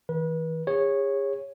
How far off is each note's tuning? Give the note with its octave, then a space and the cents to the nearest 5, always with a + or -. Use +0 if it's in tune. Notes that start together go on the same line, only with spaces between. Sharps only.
E3 -40 B4 -30
G#4 -40 C#5 -10